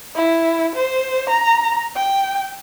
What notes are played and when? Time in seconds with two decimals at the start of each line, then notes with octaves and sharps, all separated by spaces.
0.15 E4
0.76 C5
1.29 A#5
1.95 G5